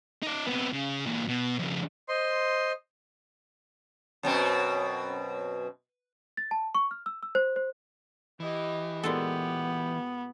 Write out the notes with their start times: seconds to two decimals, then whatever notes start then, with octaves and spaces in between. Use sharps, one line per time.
0.22 D#4 D5
0.47 C3 B3
0.72 C#3
1.06 A#2 E3
1.28 B2
1.59 F2 C#3
2.08 C5 D#5 C6
4.23 F#2 B2 C4
6.37 A6
6.51 A5
6.75 C#6
6.91 F6
7.06 E6
7.23 E6
7.35 C5
7.56 C5
8.40 E3 G4 D#5
9.03 A#2 G#3 B3 G4 A4